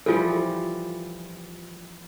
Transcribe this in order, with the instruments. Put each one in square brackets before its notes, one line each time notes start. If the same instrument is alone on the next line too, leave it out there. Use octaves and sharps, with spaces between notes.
[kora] E3 F3 G3 [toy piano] F4 A4